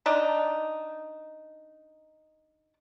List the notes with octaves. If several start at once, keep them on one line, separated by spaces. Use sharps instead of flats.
D4 D#4 A5